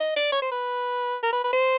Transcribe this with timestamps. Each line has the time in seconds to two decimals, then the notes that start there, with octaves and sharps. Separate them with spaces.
0.01 D#5
0.16 D5
0.32 C#5
0.42 C5
0.52 B4
1.23 A#4
1.33 B4
1.44 B4
1.53 C5